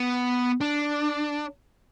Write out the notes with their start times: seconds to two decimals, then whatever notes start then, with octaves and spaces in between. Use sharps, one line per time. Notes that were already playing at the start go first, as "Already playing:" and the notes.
Already playing: B3
0.61 D4